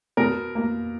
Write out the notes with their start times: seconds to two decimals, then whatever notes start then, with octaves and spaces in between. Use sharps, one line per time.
0.17 B2 A#4
0.55 A#3